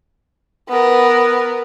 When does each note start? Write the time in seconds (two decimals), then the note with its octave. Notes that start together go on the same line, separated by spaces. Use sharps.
0.69 B3 A#4